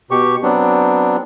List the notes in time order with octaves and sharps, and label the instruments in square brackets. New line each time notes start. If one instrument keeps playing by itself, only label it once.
[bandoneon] B2 G4 C#6
F#3 B3 C4 D4